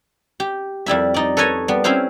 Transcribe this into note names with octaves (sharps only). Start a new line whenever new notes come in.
G4
F2 G3 E4 E5
D#4 D5
A4 B4 C#5 D#5 G#5
G3 B3
C4 C#4 E4 C5 F5